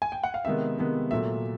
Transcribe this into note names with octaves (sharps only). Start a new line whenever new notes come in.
G#5
G5
F#5
F5
C3 D#3 G#3 B3 E5
C3 D#3 G#3 B3
A#2 F#3 A3 E5